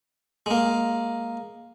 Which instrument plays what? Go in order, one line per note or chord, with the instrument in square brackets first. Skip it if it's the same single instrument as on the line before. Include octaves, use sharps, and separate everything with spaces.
[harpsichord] G#3 A#3